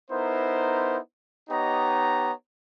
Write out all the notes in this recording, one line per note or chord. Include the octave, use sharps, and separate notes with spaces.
B3 D#4 E4 A#4 C5
B3 D#4 G4 C#5 D#5 A#5